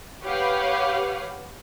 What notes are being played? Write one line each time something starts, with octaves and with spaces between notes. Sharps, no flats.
G4 B4 C#5 F5 F#5